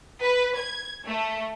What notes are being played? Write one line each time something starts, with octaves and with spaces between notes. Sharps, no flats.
B4
G#6
A3